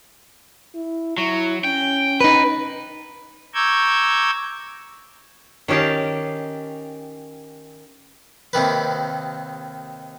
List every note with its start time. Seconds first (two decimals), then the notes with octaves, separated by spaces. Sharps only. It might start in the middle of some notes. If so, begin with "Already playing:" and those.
0.75 E4
1.18 F#3 E4
1.65 C#4 G5
2.21 D#4 B4
3.54 A#5 C#6 D6 E6 G6 G#6
5.68 D#3 C#4 G4 F5 A5
8.53 D#2 C3 D#3 B4